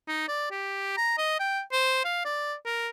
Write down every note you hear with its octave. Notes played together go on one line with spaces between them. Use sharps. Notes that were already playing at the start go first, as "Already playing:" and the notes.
D#4
D5
G4
A#5
D#5
G5
C5
F5
D5
A#4